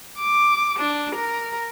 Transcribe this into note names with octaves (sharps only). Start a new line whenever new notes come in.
D6
D4
A#4